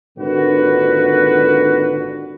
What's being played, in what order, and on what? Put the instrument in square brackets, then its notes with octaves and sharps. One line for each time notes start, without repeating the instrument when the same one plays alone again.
[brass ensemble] G#1 A#2 D3 F#4 B4